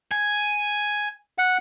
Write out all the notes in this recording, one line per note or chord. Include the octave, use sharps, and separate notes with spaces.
G#5
F#5